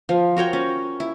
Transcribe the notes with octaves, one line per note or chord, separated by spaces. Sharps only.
F3
F#4 A#4 C#5 G5
C#4
E4